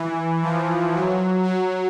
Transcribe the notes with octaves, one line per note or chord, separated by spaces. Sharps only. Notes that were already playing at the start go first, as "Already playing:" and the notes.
Already playing: E3
F3
F#3
F#3